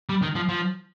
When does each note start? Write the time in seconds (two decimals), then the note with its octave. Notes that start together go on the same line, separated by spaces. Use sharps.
0.09 G3
0.22 D#3
0.36 F3
0.49 F3